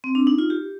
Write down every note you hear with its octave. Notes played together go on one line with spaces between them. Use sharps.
C4
D4
D#4
F4
G4